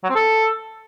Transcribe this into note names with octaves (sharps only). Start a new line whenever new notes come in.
F#3
C4
A4